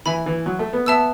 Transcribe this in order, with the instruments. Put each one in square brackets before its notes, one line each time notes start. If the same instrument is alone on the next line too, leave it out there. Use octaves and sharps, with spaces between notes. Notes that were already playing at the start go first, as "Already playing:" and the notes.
[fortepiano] E3 [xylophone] E5 G#5 B5
[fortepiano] E3
F#3
A3
B3
[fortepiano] B3 [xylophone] E5 A5 E6